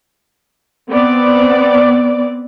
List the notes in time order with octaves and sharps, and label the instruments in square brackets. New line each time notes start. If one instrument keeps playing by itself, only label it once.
[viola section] B3 C4 D5